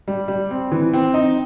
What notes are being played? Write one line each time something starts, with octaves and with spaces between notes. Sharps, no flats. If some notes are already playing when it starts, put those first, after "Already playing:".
G3
G3
C4
E3
C4
D#4